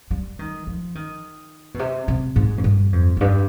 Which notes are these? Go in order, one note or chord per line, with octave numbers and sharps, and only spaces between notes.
G3
D#3
F3
D#3
B2
C3
C3
G#2
F2
G2
F2
F2
G2